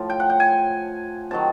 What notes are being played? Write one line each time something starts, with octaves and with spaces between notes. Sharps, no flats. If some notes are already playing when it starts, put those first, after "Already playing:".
Already playing: A2 F3
G5
F#5
G5
G#5
C3 D#3 F#3 A5